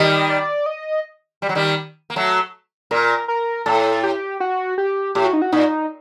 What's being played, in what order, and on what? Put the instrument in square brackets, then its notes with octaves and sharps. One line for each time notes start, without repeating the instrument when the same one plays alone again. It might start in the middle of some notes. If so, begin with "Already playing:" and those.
Already playing: [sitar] D#3 G3 [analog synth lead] D#5
[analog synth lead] D5
D#5
[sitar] G3
F#3
D#3 G3
A#3
F#3 A3
[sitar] A#2 [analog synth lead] A#4
[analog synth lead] A#4
[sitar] A2 [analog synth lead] A4
[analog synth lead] G4
F#4
G4
[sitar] A2 [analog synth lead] G4
[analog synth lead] F#4
D#4
F#4
[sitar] A#2 [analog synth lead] D#4